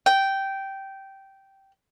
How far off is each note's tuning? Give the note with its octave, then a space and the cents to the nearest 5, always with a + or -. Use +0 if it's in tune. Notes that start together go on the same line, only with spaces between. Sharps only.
G5 -10